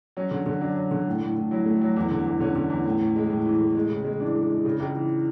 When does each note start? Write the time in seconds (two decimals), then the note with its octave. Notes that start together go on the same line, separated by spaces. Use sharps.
0.17 F#3 C#4
0.31 D3
0.46 D3
0.61 F#3 D4
0.76 F#3
0.91 D3
1.07 A2
1.22 A2
1.36 A2
1.51 F#3 E4
1.66 A3
1.82 F#3
1.96 E2
2.11 D3
2.26 E2
2.40 D3 C#4
2.55 D3
2.70 E2
2.85 A2
3.00 A2
3.16 G#3
3.30 A2
3.45 E3
3.61 A2
3.75 G#3
3.90 C#3
4.05 G#3
4.20 E3 D4
4.35 G#3
4.50 G#3
4.65 C#3
4.80 C#2
4.95 E3